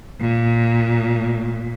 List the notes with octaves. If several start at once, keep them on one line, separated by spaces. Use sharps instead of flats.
A#2